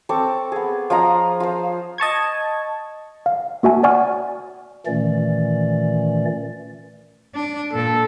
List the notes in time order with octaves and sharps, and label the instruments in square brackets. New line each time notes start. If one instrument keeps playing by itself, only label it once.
[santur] C4 A4 C#6 D6
B3 G#4
F3 F4 D#5 A#5
F4 C5
[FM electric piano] D#5 A5 C#6 G#6
[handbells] F5
A#3 F#4 E5 G#5 A5
D5 F#5 G#5 C#6 F6
[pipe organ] A#2 D#3 E3 A3 C#4 D5
[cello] D4
[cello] A#2 [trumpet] A4